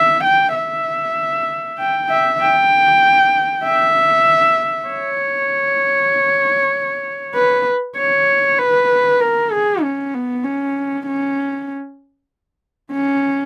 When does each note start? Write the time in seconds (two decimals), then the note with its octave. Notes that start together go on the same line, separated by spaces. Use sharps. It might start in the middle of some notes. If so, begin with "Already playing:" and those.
Already playing: E5
0.24 G5
0.55 E5
1.79 G5
2.10 E5
2.41 G5
3.64 E5
4.88 C#5
7.35 B4
7.98 C#5
8.59 B4
9.21 A#4
9.52 G#4
9.82 C#4
10.14 B3
10.44 C#4
11.07 C#4
12.92 C#4